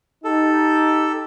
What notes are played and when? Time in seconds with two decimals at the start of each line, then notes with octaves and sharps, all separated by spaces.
0.24 D#4 G4 A4